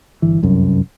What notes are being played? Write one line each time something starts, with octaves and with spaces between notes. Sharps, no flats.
G1 E3
F1 C2 F#2